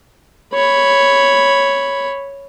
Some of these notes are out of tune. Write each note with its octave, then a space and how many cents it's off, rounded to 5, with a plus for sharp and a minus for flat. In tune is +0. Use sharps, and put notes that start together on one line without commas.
C#5 +0 B5 +0